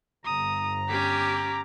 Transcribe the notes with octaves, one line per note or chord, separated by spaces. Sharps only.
G1 A#5 D#6
C#4 G4 D6 B6